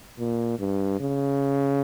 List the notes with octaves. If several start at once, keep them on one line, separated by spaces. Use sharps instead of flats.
A#2
G2
C#3